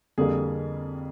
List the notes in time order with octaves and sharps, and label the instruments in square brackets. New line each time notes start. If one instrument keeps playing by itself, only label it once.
[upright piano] F2 D3 G3 A#3 G#4